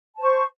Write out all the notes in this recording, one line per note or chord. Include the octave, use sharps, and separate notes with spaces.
C5 A5 C#6